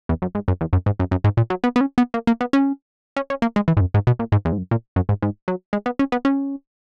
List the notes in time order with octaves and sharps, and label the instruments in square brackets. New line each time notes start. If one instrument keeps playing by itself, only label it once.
[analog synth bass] E2
F#2
G#2
F#2
E2
F#2
G#2
F#2
F#2
G#2
A#2
F#3
B3
B3
C#4
B3
A#3
A#3
B3
C#4
C#4
C#4
A#3
G#3
E3
G#2
F#2
G#2
B2
A#2
G#2
E2
G#2
F#2
A#2
F#2
G#2
G#2
F#3
G#3
B3
C#4
B3
C#4